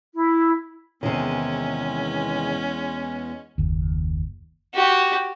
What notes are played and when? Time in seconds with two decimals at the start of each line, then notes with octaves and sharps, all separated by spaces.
0.15 E4
1.03 E2 C3 D#3 G#3 C#4
3.58 F#1 D#2
4.75 F#4 G4